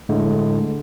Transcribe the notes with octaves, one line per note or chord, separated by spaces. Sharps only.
A2 D3 G#3 A3